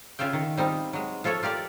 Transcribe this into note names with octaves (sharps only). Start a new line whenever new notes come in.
C#3 F4 E5 F5 G5
D#3
G3 C4 D#4 F4
F#3 G#3
F3 F4 A4 C#5 E5
F4 G4 A#4 D5